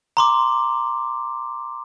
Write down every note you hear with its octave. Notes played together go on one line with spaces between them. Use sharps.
A#5 C6 D6